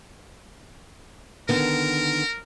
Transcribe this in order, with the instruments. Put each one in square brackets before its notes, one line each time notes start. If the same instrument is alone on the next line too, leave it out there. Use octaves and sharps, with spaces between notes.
[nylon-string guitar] D3 D#3 B3 [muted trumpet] A#4